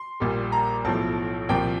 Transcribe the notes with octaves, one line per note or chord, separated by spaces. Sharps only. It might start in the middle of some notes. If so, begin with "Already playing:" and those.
Already playing: C6
A#1 A#2 G3
A#5
B1 A2 F3 A5
C2 A#2 F3 G5